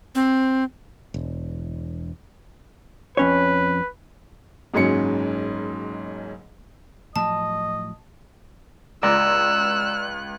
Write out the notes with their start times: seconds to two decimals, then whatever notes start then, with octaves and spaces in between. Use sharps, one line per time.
0.15 C4
1.14 E1
3.17 F2 C#4 B4 C#5
4.74 F#1 G#2 F#3 C#4 C#7
7.16 A2 F3 F#3 D#5 A5
9.03 C#2 D5 A#5 E6 F#6